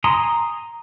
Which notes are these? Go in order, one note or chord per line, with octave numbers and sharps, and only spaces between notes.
G#5 A#5 C6 D#6